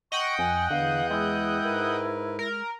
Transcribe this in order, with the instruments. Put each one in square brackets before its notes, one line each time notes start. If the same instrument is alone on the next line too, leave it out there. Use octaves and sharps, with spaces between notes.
[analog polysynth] D#5 F#5 G5 [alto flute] C#6
[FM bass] F2 [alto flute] G#5
[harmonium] E2 B3 [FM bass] D3 [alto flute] F5
[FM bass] G#3 [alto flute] E4
[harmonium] G#2 A#4 B4
[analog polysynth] A#4